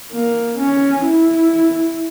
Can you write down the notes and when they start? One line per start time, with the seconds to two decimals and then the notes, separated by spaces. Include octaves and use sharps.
0.12 A#3
0.59 C#4
1.05 E4